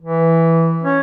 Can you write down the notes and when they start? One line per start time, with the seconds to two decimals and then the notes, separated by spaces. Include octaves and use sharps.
0.01 E3
0.83 C#4